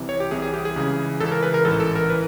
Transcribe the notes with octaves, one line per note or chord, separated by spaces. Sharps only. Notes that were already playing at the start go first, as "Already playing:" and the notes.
Already playing: C2 C3 E3
C#5
G4
C2 C3 E3 G#4
G#4
G4
G#4
C#2 C#3 E3
C#2 C#3 E3 A4
A#4
B4
A#4
A1 G#2 E3 A4
A4
A#4
E3 B4